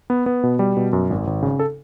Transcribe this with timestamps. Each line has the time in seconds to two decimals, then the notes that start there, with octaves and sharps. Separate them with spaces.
0.10 B3
0.26 B3
0.43 B2
0.59 G3
0.77 B2
0.93 F#2
1.10 G#1
1.27 G#1
1.42 C#3
1.59 A4